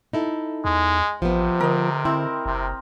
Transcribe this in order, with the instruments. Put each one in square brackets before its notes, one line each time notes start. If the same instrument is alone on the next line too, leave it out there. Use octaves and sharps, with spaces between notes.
[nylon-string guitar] D#4 E4 A4
[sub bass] E2 [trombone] G#3
[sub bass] A1 [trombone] C3 [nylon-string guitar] F3 B3
[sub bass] D3 [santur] A#4 D#5
[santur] C4 [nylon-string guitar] E4
[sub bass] F#1 [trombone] C3